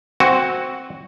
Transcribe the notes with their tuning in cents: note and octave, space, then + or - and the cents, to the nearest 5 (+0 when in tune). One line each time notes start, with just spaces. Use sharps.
C4 +0 F#4 +0 G#5 -30